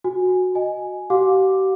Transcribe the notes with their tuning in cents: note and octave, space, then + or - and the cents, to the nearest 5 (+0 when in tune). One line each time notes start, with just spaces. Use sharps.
F#4 -10 G#5 -5
D#5 +0 G#5 +5
G4 -40 F5 +40 D6 +0